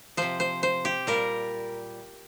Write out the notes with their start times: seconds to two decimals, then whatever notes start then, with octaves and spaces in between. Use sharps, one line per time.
0.17 C3 F3 C5
0.40 C5
0.63 C5
0.85 G4
1.07 A#2 G3 A#4